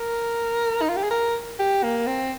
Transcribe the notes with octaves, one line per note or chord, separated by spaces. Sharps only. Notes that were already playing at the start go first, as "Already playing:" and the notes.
Already playing: A#4
D#4
F4
G4
G#4
A#4
G4
A#3
C4